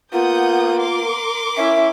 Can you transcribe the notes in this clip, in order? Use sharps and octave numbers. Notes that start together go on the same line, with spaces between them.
A#3 B3 F4 F#5 D#6 G6
A#4 C6 D6
C#4 E4 E5